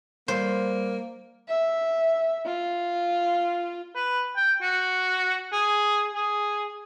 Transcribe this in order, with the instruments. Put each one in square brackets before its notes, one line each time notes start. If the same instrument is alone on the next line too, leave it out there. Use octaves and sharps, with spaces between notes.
[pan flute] G3 [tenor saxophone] A#3 [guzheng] C5
[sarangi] E5
F4
[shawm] B4
G5
F#4
G#4
G#4